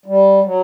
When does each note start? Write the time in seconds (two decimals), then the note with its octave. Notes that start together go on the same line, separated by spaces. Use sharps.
0.06 G3
0.44 F#3